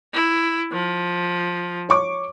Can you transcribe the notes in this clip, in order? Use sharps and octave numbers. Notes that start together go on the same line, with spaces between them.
E4
F3
C#5 C#6 D6